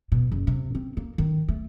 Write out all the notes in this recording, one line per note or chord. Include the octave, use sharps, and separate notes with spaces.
B2
F#1
C3
C4
A#3
D#3
A3